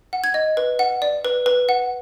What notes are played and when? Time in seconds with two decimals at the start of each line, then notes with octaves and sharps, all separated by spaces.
0.13 F#5
0.24 G#6
0.34 D#5
0.57 B4
0.79 F#5
1.02 D5
1.25 B4
1.46 B4
1.69 F#5